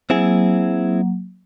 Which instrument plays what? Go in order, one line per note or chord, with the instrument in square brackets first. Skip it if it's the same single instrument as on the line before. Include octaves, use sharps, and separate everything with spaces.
[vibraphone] F#3 A#3 [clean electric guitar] C4 E4 G#4